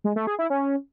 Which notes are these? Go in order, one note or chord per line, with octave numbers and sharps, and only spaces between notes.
G#3
A3
G#4
E4
C#4